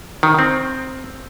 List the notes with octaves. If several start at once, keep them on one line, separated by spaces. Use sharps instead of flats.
D#3
C4